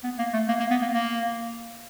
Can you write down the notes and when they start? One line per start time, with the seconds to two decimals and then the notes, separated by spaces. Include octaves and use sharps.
0.04 B3
0.19 A#3
0.34 A3
0.48 A#3
0.60 A#3
0.70 B3
0.82 A#3
0.93 A#3